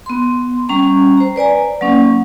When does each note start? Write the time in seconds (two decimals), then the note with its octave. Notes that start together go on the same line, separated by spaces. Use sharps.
0.06 B3 C6
0.69 G3 C#4 A#5
1.17 C5 A#5
1.36 B4 D5 G#5 A#5
1.81 F#3 A#3 C#4